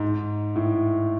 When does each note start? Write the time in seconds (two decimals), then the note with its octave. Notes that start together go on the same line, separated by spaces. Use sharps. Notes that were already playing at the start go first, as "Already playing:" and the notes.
Already playing: G#2
0.56 A2